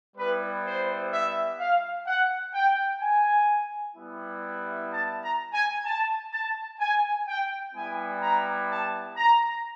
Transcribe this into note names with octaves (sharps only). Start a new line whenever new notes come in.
G3 B3 E4 B4
C5
E5
F5
F#5
G5
G#5
G3 B3 E4
A5
A#5
G#5
A5
A5
G#5
G5
G3 B3 E4 G4 G#5
A#5
A5
A#5